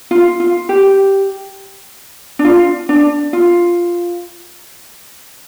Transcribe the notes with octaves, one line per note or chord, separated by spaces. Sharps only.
F4
F4
G4
D4
F4
D4
F4